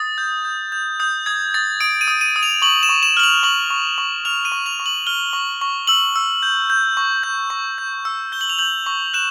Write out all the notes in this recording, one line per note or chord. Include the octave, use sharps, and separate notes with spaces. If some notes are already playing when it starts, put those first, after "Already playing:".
Already playing: D#6 A6
G6
G6
G6
D#6 G6
D#6 G#6
D#6 A6
D#6 D7
D#7
D#6
D#7
D#6
F7
C#6 F#7
E7
C#6
E7
F6 F#7
F7
C#6 F#7
C#6
C#6
F6 F7
D#7
C#6
F7
C#6
F#7
F6 G7
C#6
C#6
E6 F#7
E6
G6
G6
C#6
G6
C#6
G6
E6
G6 G7
F#7
F7
G6 F#7
C#6
F#6 E7